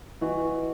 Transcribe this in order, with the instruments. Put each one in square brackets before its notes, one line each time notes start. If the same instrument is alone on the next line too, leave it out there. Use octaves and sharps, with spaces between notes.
[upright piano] E3 [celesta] F#4 B4 D#5 F#5 C#6